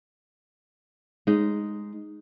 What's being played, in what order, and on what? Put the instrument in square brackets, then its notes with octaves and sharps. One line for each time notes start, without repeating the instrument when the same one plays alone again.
[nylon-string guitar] G#3 D#4